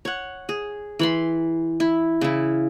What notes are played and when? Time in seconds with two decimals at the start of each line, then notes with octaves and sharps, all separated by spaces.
0.05 C#5 F#5
0.49 G#4
0.99 E3 B5 C6
1.80 E4
2.21 C#3 E4